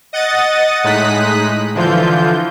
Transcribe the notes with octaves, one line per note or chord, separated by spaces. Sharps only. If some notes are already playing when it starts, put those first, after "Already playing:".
D#5 F#5 D#6 A6
A2 G#3 D#4 D#6 F#6 B6
D3 E3 F3 F4 G6